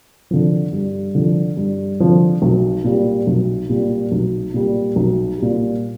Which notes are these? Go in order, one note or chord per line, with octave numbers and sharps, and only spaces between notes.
D3 F3
G2
D3 F3
G2
D3 F3
B1
A#2 G3
B1
A#2 G3
B1
A#2 G3
B1
A#2 G3